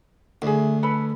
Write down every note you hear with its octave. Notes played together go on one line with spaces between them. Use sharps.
D2 E4 G#4
A4 B4 B5